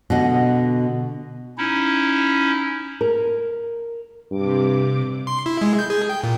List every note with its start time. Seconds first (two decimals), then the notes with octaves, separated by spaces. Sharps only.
0.10 B2 D3 D#5 F#5
1.58 C#4 D#4 E4
3.01 A#4
4.31 G2 C3 D6
5.27 C6
5.46 E4
5.61 G#3
5.79 G6
5.90 G#4
6.09 G5
6.23 A#2